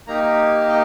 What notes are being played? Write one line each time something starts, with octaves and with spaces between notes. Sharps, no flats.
A#3 D#4 G4 A#5
D#5